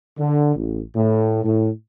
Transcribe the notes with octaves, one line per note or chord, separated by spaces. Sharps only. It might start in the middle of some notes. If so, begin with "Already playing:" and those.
D3
A1
A2
A2